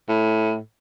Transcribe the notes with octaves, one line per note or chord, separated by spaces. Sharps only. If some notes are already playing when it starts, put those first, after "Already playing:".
A2